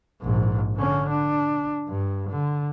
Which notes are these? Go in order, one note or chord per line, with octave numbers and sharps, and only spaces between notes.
A#1 G#2
D3 C#4
D4
G2
D3